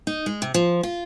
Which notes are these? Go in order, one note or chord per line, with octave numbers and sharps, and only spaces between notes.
D#4
G#3
C3
F3
F4